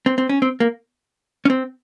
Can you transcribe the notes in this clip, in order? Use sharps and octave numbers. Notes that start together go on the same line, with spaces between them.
C4
C4
C#4
C4
A#3
C#4
C4